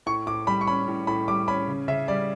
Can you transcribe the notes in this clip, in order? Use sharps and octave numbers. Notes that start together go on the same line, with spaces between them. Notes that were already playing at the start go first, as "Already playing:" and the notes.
A2 C#6
A2 D6
G3 B5
C#6
C#4 B5
A2
A2 B5
G3 D6
C#4 B5
C#3
C#3 E5
G3 D5